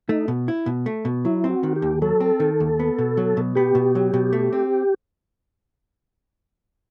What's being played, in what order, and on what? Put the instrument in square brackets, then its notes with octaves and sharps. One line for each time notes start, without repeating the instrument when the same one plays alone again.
[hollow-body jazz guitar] A3 [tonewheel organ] D#4
[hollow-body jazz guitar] B2
E4
B2
A3
B2
[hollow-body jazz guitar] F#3 [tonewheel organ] E4
[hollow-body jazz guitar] C4
[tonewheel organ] F#4
[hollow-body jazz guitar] D#3
[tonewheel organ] G4
[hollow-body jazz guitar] D#2
[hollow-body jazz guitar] F#3 [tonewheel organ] A4
[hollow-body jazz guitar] C4
D#3
D#2
B3
B2
F#3
B2
[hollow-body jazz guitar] B3 [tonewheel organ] G4
[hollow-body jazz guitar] B2
F#3
B2
A3
C4